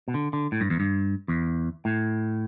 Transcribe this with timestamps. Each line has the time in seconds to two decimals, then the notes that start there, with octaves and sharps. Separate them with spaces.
0.08 B2
0.14 D3
0.33 D3
0.52 A2
0.61 G2
0.70 E2
0.80 G2
1.28 E2
1.85 A2